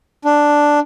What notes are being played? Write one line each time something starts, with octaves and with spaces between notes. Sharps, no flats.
D4